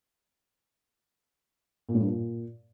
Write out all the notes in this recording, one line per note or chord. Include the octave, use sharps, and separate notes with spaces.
A#2
A2
G2
A#2